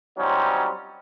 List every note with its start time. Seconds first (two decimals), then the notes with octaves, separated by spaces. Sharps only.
0.18 F#3 G3 C4 C#4 D#4 F4